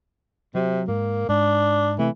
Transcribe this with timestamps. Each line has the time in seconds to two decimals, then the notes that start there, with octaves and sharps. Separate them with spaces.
0.55 C3 F#3
0.88 G#2 A#3
1.29 G#2 D4
1.99 C3 E3 A3